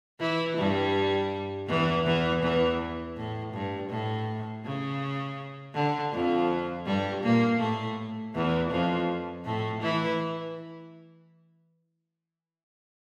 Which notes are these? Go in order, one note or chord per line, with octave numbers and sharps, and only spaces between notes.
E3 E4
G2 G3
E2 E3
E2 E3
E2 E3
A2
G2
A2
C#3
D3
F2 F3
G2 G3
A#2 A#3
A2 A3
E2 E3
F2 F3
A2 A3
E3 E4